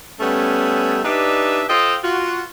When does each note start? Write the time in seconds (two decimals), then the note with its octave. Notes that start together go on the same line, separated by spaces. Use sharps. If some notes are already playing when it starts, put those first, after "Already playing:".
0.20 G3 A3 B3 C#4
1.04 D4 D#4 G4 B4 D5 E5
1.68 F4 A4 C5 D#5 F5 G5
2.04 F4 F#4